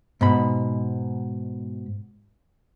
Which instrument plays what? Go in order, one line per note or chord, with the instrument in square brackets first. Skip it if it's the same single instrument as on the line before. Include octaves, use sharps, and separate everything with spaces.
[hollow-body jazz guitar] G#2 B2 B5